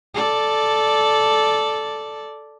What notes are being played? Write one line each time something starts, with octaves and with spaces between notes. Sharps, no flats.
A4 D5